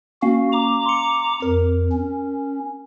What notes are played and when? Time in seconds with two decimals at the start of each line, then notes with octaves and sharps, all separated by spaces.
0.22 A#3 C#4 F#4 F5
0.53 A#5 D6
0.86 C6 C#7
1.42 F2 A#4
1.92 C#4